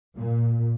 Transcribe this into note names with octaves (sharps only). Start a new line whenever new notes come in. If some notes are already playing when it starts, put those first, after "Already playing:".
A#2